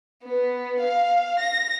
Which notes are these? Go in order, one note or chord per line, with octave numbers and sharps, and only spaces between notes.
B3
F5
A#6